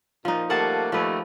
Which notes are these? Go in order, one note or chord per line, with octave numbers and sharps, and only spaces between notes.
A#2 F3 D#4
G3 A3 A#3 F#5 A5
D#2 F3 A3 B4